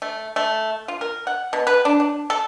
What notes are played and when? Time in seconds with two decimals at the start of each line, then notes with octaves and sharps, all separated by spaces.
0.02 A3
0.36 A3
0.88 F4
1.01 A#4
1.27 F#5
1.53 B2
1.67 B4
1.85 D4
2.00 D4
2.30 A4